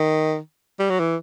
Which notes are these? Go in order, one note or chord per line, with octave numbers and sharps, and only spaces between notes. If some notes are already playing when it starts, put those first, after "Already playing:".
Already playing: D#3
G3
F#3
E3